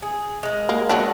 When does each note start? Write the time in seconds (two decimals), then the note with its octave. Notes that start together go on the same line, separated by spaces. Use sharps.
0.02 G#4
0.43 G#3 A#4
0.69 A#3
0.89 F#3 G#3 B3 D4